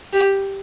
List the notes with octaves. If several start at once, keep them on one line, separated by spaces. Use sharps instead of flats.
G4